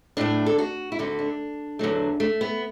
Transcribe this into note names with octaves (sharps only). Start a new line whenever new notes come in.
A2 A3 D4
A4
F#4
E4
D2 D3 A3 F#4
D4
E2 D3 F#3 A3
A3
B3